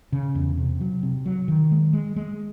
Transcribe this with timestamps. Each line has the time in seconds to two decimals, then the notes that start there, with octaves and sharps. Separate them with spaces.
0.12 C#3
0.35 E2
0.57 C3
0.81 F#3
1.03 C3
1.26 F#3
1.48 D#3
1.71 G#3
1.93 G#3
2.16 G#3